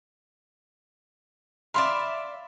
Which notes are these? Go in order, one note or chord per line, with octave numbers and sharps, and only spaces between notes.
D5 E5 F5 B5 C6